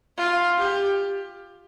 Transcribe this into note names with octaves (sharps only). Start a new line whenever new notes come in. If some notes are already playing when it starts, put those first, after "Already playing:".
F4
G4